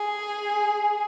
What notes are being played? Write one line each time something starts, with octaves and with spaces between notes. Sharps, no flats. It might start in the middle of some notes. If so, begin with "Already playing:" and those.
Already playing: G#4